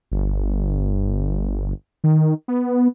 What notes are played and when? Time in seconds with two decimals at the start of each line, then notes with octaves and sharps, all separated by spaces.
0.11 G1
2.04 D#3
2.48 B3